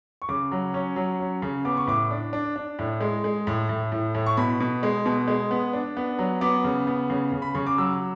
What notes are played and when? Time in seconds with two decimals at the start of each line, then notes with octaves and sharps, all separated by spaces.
0.22 C#6
0.29 C#3 D6
0.52 F#3
0.74 C#4
0.96 F#3
1.20 C#4
1.42 C#3
1.65 B3 D6
1.77 C#6
1.87 A2 D6
2.11 D4
2.33 D4
2.56 D4
2.79 A2
3.00 G#3
3.24 G#3
3.47 A2
3.69 A2
3.92 A2
4.15 A2
4.26 C#6
4.37 B2 B5
4.60 B2
4.83 G#3
5.06 B2
5.28 G#3
5.51 B3
5.73 D4
5.97 B3
6.19 F#3
6.41 B3 D6
6.64 C#3
6.87 B3
7.10 C#3
7.32 C#3
7.42 B5
7.55 C#3 C#6
7.66 D6
7.78 F#3 E6